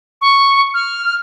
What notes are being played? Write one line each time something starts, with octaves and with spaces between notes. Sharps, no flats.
C#6
F6